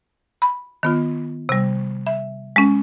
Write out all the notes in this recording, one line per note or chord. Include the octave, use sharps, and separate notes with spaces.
B5
D#3 B3 F4
C3 G3
E5
G#3 C#4